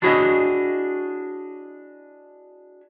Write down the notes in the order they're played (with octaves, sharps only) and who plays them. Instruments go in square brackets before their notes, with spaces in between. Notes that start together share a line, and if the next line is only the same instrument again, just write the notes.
[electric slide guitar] D4 E4 F#4 G#4 C#5 D#5